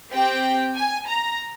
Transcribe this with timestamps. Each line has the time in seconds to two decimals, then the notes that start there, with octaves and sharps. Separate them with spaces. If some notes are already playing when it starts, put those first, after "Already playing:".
0.12 C4 G4 G5
0.75 G#5
1.08 A#5